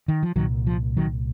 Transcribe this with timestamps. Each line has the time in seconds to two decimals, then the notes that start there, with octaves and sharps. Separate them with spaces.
0.08 D#3
0.23 F3
0.36 C2 A#2 D#3 F#3
0.67 F3
0.97 D#3 F#3